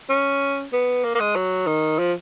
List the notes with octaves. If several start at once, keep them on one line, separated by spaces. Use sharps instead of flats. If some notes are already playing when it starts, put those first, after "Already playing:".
C#4
B3
A#3
A#3
G#3
F#3
D#3
F3